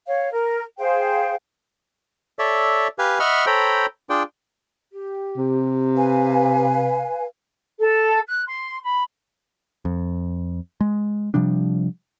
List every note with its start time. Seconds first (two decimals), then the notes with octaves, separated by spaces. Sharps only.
0.08 C#5 F5
0.33 A#4
0.79 G#4 C5 F5 G5
2.39 A4 C#5 D5 E5
2.99 G4 B4 F5 G#5
3.20 D#5 E5 F#5 B5 C#6 F6
3.46 A4 C5 C#5 G5 A#5 B5
4.10 D4 F4 G#4 D5 G5
4.92 G4
5.37 C3
5.96 B4 F5 G#5
7.79 A4
8.27 F#6
8.46 C6
8.82 B5
9.85 F2
10.81 G#3
11.34 C3 F3 G3 D4